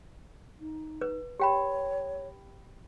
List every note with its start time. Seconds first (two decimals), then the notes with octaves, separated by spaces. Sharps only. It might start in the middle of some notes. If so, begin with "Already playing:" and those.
0.60 D#4
1.01 B4
1.40 G4 C#5 G5 B5